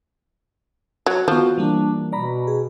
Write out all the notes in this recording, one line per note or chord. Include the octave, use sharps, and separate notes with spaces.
F#3
D#3 F3 B3 F#4
E3 G3 A#3 D4
B2 D5 A#5 B5
G#4